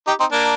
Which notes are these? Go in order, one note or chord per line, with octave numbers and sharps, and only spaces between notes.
D#4 G4
C4 D#4
A#3 D4